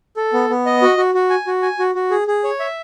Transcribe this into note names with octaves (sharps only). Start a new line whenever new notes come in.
A4
B3
B3
D#5
F#4
F#4
F#4
G#5
F#4
G#5
F#4
F#4
G#4
G#4
C#5
E5